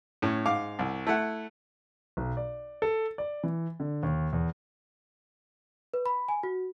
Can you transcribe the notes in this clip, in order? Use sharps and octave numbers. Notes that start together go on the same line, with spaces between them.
A2 C#4
G#2 F5 D6
C2
A3 E4 F#5
B1
D5
A4
D5
E3
D3
D#2
E2
B4
B5
G#5
F#4